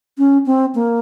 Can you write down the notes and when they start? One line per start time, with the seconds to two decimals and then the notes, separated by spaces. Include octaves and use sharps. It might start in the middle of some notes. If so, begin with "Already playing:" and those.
0.18 C#4
0.46 C4
0.75 A#3